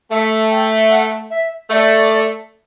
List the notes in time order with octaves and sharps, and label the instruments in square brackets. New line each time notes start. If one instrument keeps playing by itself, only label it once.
[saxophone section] A3 [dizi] E5
[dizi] G5
F#5
E5
[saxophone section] A3 [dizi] E5
[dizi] D5